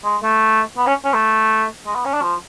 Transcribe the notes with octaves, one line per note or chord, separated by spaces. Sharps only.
G#3
A3
B3
C#4
C#4
A3
G#3
B3
C#4
D4
F3